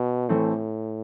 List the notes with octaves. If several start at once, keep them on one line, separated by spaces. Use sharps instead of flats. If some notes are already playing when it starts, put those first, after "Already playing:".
Already playing: B2
A2 E3 A3 C4